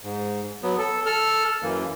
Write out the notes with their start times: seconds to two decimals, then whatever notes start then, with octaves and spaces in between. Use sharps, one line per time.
0.03 G#2
0.63 F#3 B3
0.78 A4
1.06 A4 F6
1.63 F#2 E3 A#3